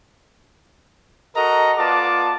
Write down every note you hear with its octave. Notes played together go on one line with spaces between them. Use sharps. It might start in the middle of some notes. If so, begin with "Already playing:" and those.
F#4 A4 A#4 D#5 A#5
B3 F4 D5 A5 D6